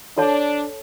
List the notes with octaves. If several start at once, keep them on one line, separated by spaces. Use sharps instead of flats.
D4 A4 C#5 A5